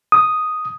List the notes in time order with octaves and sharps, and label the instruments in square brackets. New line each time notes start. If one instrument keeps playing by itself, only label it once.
[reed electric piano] D#6